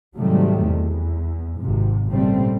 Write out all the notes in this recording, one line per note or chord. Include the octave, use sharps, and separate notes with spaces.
G#2 C3 D#3 F#3 G3 A3
E2
G#1 G#2 C3
A#2 C#3 G3 A3 C4